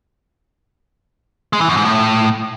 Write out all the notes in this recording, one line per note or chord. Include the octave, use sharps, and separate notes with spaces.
G#3
E3
F#2
G#2
A2